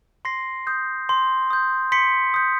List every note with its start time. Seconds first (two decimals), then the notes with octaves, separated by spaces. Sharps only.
0.25 C6 A#6 C7
0.67 D#6 G6
1.09 C6
1.50 D#6 G6
1.92 C6 B6 C#7
2.34 D#6 G6